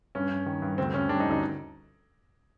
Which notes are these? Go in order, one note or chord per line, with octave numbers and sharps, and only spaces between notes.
G2 C#4
G2
D#3
G2
D2 C4
D2 C#4
G3 D4
D#4
D2
D#4